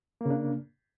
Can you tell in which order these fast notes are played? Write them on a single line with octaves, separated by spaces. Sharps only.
A#3 C#3 D4